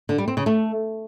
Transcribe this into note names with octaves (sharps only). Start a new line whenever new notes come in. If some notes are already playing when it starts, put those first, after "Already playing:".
D3
G3
C4
C#3
A3